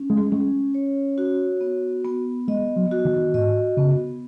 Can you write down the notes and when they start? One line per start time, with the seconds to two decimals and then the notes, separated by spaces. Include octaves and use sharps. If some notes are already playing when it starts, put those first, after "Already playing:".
Already playing: C#4
0.10 G#3
0.32 G#3 C#4
0.75 C#5
1.18 F#4
1.61 B3
2.05 B3
2.48 G#3 D#5
2.76 F#3
2.91 F#4
3.05 D#3
3.34 G#2 D#5
3.77 C#3 B3